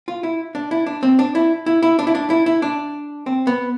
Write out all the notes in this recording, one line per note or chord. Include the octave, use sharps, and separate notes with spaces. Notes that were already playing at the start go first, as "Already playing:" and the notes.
F4
E4
D4
E4
D4
C4
D4
E4
E4
E4
D4
E4
D4
E4
E4
D4
C4
B3